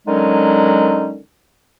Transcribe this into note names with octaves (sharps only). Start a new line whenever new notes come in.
D3 D#3 F#3 G#3 C#4 D#4